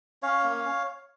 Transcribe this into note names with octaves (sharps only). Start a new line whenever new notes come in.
C#4 C#5 F5
A#3